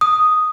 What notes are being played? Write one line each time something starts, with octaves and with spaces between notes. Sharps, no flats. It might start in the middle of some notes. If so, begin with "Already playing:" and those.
D#6